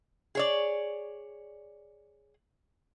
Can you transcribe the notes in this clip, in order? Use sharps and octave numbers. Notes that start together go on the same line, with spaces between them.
G#4 C#5 D5